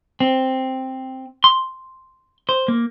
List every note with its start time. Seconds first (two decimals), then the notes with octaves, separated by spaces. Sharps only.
0.20 C4
1.44 C6
2.49 C5
2.68 A#3